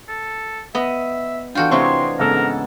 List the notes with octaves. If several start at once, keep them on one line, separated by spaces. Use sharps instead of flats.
A4
B3 D#5 E5
E3 D4 F4 F#4 A4 G5
C3 A3 C4 C#5 D#5 C6 C#6
G#2 C#3 G#3 B3 A4 A#4